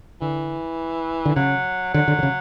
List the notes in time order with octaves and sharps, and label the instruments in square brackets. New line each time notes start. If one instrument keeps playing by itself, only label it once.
[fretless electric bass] D3 [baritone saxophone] E3
[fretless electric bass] D3
[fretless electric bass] C#3 [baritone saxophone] F#3
[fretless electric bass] D3 [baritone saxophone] F#3
[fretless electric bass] D3
D3
C#3